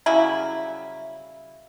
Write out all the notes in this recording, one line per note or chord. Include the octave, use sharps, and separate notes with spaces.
C#3 F#3 G3 E4